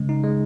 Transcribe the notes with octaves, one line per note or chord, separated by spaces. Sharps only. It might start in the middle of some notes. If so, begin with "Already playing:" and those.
Already playing: C#3 G#3
D#4
G#3